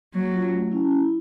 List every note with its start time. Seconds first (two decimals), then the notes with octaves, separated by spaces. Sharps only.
0.13 F#3 A#3
0.33 C#4 F4
0.53 A3
0.72 C#4 E4
0.91 E4